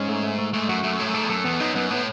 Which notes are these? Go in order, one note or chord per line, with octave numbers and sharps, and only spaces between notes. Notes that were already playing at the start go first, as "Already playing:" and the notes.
Already playing: G#2 C#4
A3
A3
A3
G#2 A3
F#2 F#4
F#2 A3
A2 A3
F#2
G#2 A4
E2
F#2 A4
E2 B3
F#2 D#4
F#2 B3
A2 B3